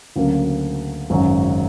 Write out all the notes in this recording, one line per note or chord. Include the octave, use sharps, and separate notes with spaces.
D2 C#3 F#3 A#3
G#1 F#2 C#3